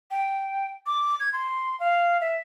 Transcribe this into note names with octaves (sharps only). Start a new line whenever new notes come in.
G5
D6
G#6
C6
F5
E5